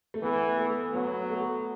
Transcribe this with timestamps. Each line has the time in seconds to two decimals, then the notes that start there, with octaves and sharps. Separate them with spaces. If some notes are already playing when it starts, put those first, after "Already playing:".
0.14 A3
0.22 E3 B3
0.58 A3
0.93 F#3 B3
1.29 A3